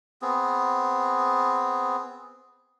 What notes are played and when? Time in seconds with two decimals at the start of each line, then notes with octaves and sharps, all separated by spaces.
0.22 B3 C4 G#4